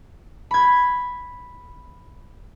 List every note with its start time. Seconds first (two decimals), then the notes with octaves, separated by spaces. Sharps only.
0.51 B5 G#6